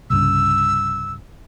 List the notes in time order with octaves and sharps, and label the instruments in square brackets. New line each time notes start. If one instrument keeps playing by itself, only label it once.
[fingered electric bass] C2 G2 C#3 [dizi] E6